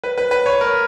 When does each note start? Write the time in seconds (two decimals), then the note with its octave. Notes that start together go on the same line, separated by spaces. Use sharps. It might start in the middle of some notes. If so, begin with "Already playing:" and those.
0.04 B4
0.18 B4
0.31 B4
0.46 C#5
0.61 A#4